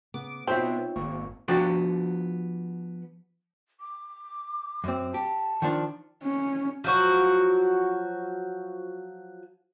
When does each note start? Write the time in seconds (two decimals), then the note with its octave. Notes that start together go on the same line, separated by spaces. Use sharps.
0.14 C#3 B3 D6
0.47 B2 C4 D#4 F4 C5 C#5 E5
0.96 G#1 A#3 C#6
1.48 F3 B3 D4 F#4 G4
3.80 D6
4.84 F#2 C4
5.14 G4 A5
5.62 D#3 F3 D4
6.23 C#4
6.84 F3 F#3 F#4